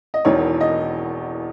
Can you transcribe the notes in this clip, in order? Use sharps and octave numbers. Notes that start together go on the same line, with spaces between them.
D#5
E1 E2 D#3 C#5
D#5